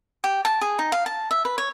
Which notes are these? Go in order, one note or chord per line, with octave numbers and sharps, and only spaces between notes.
G4
A5
G#4
D#4
F5
A5
E5
B4
C#5